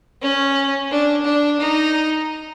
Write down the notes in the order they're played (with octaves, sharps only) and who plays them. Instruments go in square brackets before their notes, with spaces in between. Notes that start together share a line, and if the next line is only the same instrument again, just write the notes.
[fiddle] C#4
D4
D4
D#4